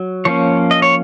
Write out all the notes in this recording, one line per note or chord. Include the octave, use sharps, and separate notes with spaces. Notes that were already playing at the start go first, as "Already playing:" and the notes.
Already playing: F#3
F3 A#3 C#4 C#5
D#5
C#5